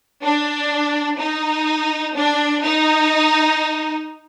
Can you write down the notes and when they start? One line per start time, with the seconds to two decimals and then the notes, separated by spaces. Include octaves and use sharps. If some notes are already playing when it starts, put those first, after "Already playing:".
0.23 D4
1.19 D#4
2.15 D4
2.63 D#4